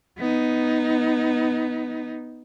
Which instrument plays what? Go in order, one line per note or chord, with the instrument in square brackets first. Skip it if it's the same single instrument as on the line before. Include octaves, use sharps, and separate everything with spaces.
[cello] B3 D#4